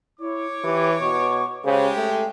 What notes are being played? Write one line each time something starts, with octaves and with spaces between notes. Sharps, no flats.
E4 C#5 D6
E3 G4
B2 C#6
C#3 G#3 G4 C5
A3 G5